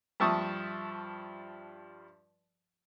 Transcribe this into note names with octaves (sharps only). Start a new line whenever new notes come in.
G2 F3 E5 A5 C#6 D#6